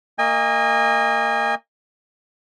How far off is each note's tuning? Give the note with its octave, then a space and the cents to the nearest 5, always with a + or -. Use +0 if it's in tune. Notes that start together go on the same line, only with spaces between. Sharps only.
A#3 -25 D#5 +0 G#5 -35